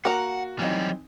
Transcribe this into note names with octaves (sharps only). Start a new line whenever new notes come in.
A#3 F#4 F#5 A#5
E3 F#3 G3 C4 D#4